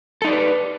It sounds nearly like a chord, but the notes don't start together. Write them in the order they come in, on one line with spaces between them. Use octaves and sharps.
A4 D#4 D5 G4 B4